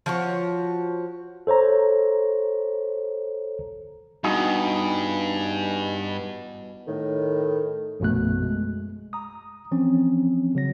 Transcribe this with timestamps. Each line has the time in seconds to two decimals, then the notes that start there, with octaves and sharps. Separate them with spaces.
0.06 F3 F#4 C#5
1.47 A4 C5 C#5 A#5
4.24 G2 B2 E3 D#4 G#4
6.87 A2 D#3
8.00 A#1 F#2 B2 A3 F#6
8.43 G#3
9.13 A#5 D#6
9.71 E3 F3 C4 C#4
10.55 C#3 F#3 A#6